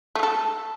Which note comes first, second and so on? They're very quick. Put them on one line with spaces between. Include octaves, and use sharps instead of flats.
A3 G#3 A4